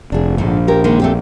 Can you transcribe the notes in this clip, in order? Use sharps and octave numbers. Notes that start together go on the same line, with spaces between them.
F1 D4 G#4
A#1 G#2 D3
G4 A#4
D#3 G#3 A#3
A3 C4 G4